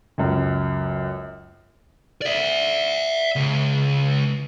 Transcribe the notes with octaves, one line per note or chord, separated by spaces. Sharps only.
C#2 F#2
D5 E5
C#2